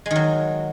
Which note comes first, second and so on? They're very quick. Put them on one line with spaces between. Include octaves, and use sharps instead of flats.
G#3 D#3 F#3